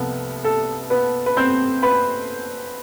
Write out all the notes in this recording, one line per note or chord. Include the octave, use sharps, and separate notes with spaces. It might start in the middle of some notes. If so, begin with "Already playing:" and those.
Already playing: C2 C3 F3 A3 B3 B4
A4
B3 B4
B4
C4 C5
B4 B5